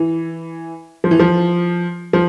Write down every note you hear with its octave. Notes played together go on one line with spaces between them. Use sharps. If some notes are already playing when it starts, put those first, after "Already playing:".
Already playing: E3
F3
E3
F3
F3